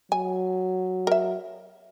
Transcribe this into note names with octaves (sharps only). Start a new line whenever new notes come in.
F#3 G#5
A#4 E5